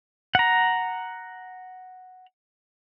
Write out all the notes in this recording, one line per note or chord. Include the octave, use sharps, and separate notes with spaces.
F#5 A#5